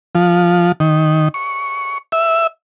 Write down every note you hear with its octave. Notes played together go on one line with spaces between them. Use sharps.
F3
D#3
C#6
E5